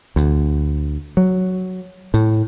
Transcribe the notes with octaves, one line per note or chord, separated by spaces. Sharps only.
D2
F#3
A2